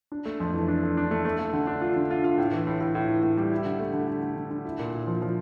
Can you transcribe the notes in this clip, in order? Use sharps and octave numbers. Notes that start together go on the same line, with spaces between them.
D4
A3
F2
E3
D4
A3
D4
A3
A3
A3
D3
D4
F4
D3
F4
F4
A2
E3
A2
A2
A2
E3
A2
G3
E4
D3
A3
D3
D3
D3
D3
D3
E4
A#2
E4
F3
F3